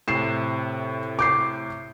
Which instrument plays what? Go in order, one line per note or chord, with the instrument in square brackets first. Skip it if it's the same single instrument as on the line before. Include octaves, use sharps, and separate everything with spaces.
[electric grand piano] A2 C3 [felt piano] C7 E7
[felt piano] D6 G6 C7